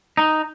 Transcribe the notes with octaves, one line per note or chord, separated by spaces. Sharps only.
D#4